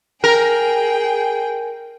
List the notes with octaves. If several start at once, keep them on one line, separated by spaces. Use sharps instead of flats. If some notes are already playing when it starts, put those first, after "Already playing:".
G#4 A#4 G5